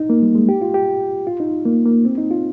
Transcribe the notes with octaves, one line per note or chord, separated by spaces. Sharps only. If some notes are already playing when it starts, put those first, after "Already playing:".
Already playing: D#4
A#3
G3
G#3
G4
F4
G4
F4
D#4
A#3
A#3
C4
D#4
F4